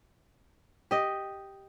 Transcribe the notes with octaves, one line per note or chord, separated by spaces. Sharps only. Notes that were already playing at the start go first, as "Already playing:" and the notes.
G4 D#5